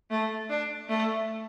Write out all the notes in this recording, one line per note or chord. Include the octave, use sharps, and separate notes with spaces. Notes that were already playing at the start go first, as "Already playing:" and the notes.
A3
D4
A3